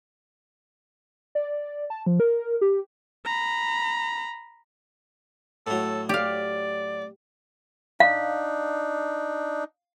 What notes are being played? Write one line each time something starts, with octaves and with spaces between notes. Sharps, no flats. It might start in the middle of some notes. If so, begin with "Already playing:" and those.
D5
A5
F3
A#4
G4
A#5 B5
A2 F#3 A4
G4 D5 F5
D4 D#4 F5